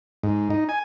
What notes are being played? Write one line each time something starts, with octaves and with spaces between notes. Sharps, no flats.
G#2
D#4
G#5